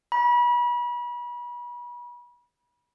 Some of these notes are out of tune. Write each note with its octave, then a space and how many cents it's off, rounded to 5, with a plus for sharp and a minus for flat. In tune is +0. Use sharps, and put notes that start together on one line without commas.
B5 -35